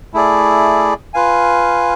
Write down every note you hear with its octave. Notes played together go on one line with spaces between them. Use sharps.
A3 E4 G#4 D5
F4 B4 F5 G#5